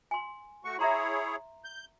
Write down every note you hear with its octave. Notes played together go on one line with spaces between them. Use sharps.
G#5 C6
A3 F#4 C#6
E4 G#4 C#5 E5 A#5 C6
G6